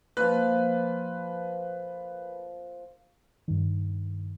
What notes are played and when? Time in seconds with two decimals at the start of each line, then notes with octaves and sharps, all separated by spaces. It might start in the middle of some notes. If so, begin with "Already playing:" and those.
0.17 A#2 F3 B4 F#6
3.48 G2 D#3